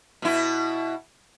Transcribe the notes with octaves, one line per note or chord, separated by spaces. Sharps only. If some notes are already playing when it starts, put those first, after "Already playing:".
B2 E4